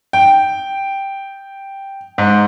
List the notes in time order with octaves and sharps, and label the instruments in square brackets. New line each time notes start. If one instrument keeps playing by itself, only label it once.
[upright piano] G5
G#2